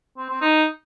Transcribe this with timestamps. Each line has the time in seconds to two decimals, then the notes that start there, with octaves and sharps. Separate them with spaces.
0.17 C4
0.29 C4
0.41 D#4